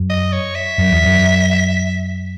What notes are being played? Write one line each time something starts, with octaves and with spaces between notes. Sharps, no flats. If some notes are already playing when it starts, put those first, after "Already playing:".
Already playing: F#2
D#5
C#5
E5
F#2
E2
F#2